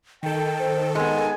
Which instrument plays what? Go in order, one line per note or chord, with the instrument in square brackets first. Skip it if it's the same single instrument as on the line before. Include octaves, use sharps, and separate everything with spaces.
[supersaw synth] D#3 A4 [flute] G5
[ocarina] C5
[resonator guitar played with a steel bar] G#3 B3 [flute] G#5 [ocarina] C6